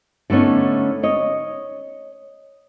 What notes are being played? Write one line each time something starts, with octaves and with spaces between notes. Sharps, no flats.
D3 A3 B3 C#4 D#4
C#5 D#5